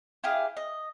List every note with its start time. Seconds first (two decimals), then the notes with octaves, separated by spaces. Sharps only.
0.24 E4 G4 G#4 F5
0.57 D#5